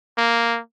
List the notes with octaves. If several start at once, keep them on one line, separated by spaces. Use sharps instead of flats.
A#3